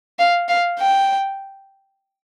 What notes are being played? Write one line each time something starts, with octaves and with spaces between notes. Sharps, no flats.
F5
F5
G5